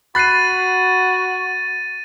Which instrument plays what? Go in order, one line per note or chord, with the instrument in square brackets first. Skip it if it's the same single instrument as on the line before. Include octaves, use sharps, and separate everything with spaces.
[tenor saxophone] F#4 [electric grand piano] B5 F#6 C7 [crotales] A6 D#7